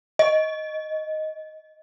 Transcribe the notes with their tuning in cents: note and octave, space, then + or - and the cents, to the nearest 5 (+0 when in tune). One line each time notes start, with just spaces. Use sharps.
D#5 +10